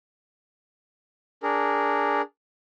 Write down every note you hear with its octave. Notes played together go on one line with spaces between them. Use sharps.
D4 G#4 A#4